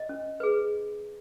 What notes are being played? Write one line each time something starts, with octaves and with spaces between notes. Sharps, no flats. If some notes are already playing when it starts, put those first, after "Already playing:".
Already playing: D#5
C#4
G#4 B4